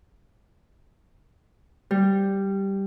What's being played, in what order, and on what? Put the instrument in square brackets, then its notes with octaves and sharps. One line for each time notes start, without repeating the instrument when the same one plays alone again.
[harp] G3